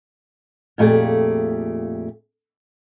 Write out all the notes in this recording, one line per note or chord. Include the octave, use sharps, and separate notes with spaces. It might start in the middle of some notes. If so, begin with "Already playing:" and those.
F2 A#2 A3 G4 G#4